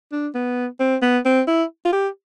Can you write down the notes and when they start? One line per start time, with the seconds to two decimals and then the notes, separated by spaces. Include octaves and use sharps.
0.12 D4
0.35 B3
0.80 C4
1.02 B3
1.25 C4
1.47 E4
1.85 F4
1.92 G4